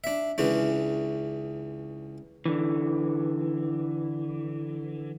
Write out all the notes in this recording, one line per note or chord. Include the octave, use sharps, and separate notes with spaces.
D4 E5
C#2 C#3 E3 D4
D3 E3